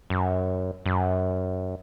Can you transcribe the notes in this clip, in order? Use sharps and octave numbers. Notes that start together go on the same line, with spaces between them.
F#2
F#2